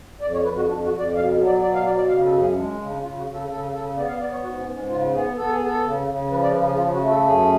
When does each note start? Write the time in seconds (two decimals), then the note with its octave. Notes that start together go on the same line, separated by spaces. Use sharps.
0.21 F2 D5
0.33 C#5
0.44 F2 B4
0.56 F#4
0.68 F2 D4
0.84 F#4
0.91 F2
0.99 D5
1.15 B2 F5
1.38 F#3
1.46 D5
1.62 B2 D5
1.74 F5
1.85 B2 D5
1.97 D5
2.08 C#3 F5
2.25 A4
2.33 F#2
2.41 G#4
2.56 G#3 D4
2.72 C#4
2.79 C#3
2.87 D4
3.03 C#3 F4
3.18 F#4
3.26 C#3
3.34 A4
3.49 C#3 A4
3.72 C#3 A4
3.97 B3 D5
4.08 F5
4.19 B3 D5
4.31 C#5
4.43 G#2 F#4
4.59 C#4
4.67 G#2
4.75 C#4
4.89 C#3 F4
5.13 B3 G#4
5.36 B3 A4
5.50 G#4
5.60 B3
5.65 A4
5.84 C#3
6.07 C#3
6.31 F3 B4
6.43 D5
6.54 C#3 B4
6.66 G#4
6.77 C#3 F4
6.93 F#4
7.01 A3
7.09 A4
7.25 F#2 G#4